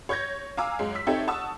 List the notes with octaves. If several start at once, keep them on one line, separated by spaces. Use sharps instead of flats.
C#5 C#6 G6 G#6 A#6
F5 G#5 A#5 D6 E6
F#2 G#3
E6 B6
C4 D#4 G4 A4 C#5 E5
F#5 A5 C#6 D#6 E6